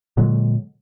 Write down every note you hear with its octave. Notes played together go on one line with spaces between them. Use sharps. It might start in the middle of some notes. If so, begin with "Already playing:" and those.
A#2 D3 F#3 G#3